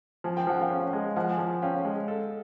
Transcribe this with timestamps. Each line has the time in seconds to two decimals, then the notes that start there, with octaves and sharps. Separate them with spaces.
0.24 F3 G#5
0.37 G5
0.47 F3 F#5
0.61 F5 G5
0.70 C#4
0.93 G#3
1.16 F3 F#5 G#5
1.39 F3
1.62 C#4 F5 G5
1.85 G#3
2.08 A4